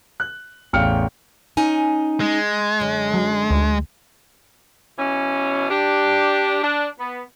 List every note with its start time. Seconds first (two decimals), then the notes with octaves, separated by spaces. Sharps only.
0.20 F#6
0.73 A1 E2 F5 G5 F6 C#7
1.57 C#4 D#4 G#5
2.21 G#3
2.80 F#2 D3
3.14 F#3
3.50 D2
4.98 B2 E3 C#4
5.70 D4 G4
6.63 D4
6.99 B3